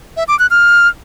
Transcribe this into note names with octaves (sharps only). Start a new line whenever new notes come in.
E5
D6
F#6
F6